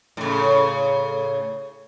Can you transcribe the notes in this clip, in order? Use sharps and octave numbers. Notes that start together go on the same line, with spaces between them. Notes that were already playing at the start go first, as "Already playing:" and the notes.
A2 C#3